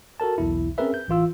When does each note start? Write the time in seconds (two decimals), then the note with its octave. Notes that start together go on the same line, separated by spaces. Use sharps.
0.20 F#4 A4 A#4 A5
0.38 B1 E2 E4
0.78 C4 C#4 G#4 A#4 B4 E5
0.94 G6
1.08 A1 E3 F4 E6